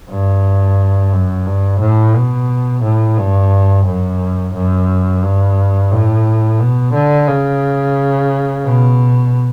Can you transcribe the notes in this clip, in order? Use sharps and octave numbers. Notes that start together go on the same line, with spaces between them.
G2
F#2
G2
A2
B2
A2
G2
F#2
F#2
G2
A2
B2
D3
C#3
B2